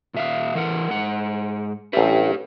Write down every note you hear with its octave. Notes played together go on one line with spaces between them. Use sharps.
A#2 E5 F5
E3 A#4 F#5
G#2 F#5
A1 G4 B4 E5